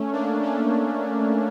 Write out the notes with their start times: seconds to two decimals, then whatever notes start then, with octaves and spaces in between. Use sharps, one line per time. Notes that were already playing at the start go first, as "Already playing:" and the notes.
Already playing: A3 C#4
0.12 A#3 D4
0.43 A3 C#4